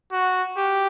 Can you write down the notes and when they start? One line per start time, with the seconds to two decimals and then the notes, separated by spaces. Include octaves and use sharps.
0.12 F#4
0.57 G4